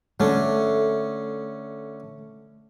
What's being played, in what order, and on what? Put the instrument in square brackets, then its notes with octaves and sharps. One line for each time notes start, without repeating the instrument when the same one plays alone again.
[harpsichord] D3 C#4 D4 [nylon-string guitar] A3